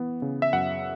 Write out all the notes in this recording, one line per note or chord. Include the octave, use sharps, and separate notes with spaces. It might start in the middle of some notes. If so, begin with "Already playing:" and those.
Already playing: E3 B3
C#3
E5
F#2 F#5